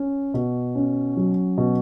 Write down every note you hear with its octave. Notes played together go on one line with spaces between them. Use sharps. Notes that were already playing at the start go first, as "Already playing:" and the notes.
Already playing: C#4
B2
C#4
F#3
B2